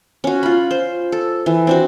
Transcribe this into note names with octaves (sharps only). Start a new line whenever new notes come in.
C#4 F#4
F4 B5
C5
A4
E3
C4 D4 F#4